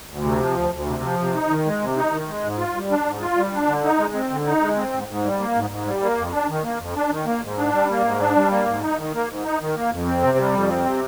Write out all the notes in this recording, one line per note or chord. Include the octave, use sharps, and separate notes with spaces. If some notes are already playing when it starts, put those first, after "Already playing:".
D2
C3
F3
D2
D2
C3
F3
C3
D#4
D#3
G#3
C3
D#4
D#3
G#3
G#2
F4
G3
D4
G#2
F4
G3
D4
D3
D#4
G#3
C4
D3
D#4
G#3
C4
G#2
G#2
G3
A#3
G#2
G#2
G3
A#3
F2
D4
D#3
A#3
F2
D4
D#3
A#3
G#2
D4
G3
A#3
G#2
D4
G3
A#3
G#2
D#4
D#3
A#3
G#2
D#4
D#3
A#3
F2
C4
C3
G3
F2
C4
C3